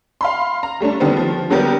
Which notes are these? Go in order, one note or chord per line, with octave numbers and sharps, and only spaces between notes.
F5 B5 C6
A#5
G3 A3 C#4 D4
D3 D#3 G3 B3 C4
F3
D3 F#3 G3 B3 G4 A#4